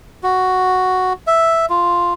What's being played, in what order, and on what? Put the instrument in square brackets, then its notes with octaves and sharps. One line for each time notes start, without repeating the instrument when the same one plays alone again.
[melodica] F#4
E5
F4